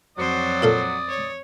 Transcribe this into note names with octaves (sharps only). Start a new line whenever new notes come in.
F2 F#3 C5 D5 D#6
A#2 A4 F5
C#5